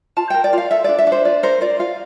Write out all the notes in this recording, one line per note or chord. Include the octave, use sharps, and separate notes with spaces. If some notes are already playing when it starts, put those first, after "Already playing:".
F4 A5
A#4 G5
D5
F4 F5
A4 E5
D4 D5
E5
D4
C5
F4 D5
A#4 C5
F4 D5
F4 F5